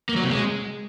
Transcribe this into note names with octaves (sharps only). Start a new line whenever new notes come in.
A#3
F#3
C3
G#3